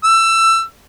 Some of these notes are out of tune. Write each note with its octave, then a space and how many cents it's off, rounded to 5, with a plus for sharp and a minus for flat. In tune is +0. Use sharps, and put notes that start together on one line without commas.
E6 +20